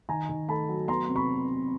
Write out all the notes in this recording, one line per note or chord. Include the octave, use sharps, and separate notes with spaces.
D#3 G#5 A#5
D#3
A3 A5 B5
F#3
B3 A#5 C6
C3
B5 C#6